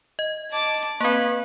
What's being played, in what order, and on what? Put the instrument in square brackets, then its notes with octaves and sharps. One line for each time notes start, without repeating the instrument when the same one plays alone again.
[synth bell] D#5
[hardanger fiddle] A5 D6
[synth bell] A#3 C4 [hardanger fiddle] B4